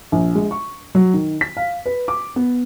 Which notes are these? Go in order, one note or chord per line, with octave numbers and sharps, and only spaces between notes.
A#1
G#3
C#6
F#3
D#3
B6
F5
B4
D6
B3